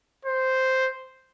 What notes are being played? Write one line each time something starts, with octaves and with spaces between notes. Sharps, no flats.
C5